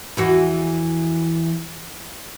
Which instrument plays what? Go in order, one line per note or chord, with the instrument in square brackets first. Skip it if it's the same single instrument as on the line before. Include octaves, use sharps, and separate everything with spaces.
[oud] E2 E3 F#4